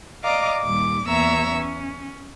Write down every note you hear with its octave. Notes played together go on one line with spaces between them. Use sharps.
D5 D#5 F5 A#5 D6
D#2 A#2 G3 D6
E2 A#3 C#5 E5 A#5 E6
C#4